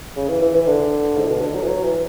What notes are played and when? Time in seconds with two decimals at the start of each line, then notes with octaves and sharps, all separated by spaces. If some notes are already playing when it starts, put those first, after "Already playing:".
0.16 C#3
0.29 E3
0.42 E3
0.55 E3
0.67 D3
1.18 G#2
1.25 A2
1.30 B2
1.41 D3
1.54 F#3
1.62 E3
1.67 F#3
1.83 E3